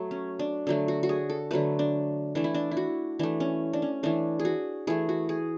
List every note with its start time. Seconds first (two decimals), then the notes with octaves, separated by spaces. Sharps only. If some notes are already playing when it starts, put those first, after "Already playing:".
Already playing: F#3 A3
0.11 C#4
0.39 D4
0.67 D3 F#3 A3
0.88 F#4
1.03 F#4
1.09 G#4
1.30 A4
1.51 D3 F#3 A3 B4
1.79 D4
2.35 E3 A3 D4
2.44 E4
2.54 D4
2.71 E4
2.77 F#4
3.19 E3 A3 D4
3.40 C#4
3.73 D4
3.82 C#4
4.03 E3 A3 D4
4.39 G#4
4.45 F#4
4.87 E3 A3 G#4
5.09 F#4
5.29 G#4